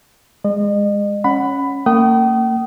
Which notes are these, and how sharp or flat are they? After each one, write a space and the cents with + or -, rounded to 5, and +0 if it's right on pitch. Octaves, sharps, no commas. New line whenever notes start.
G#3 -20 D#5 -35
C#4 +0 F#5 +0 B5 +15
A#3 -35 G5 -40 D#6 +0